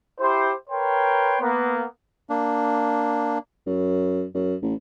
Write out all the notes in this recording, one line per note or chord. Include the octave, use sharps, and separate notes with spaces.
E4 G4 C5
A#4 B4 C#5 G5 C6
A#3 B3
A#3 D4
F#2
F#2
A1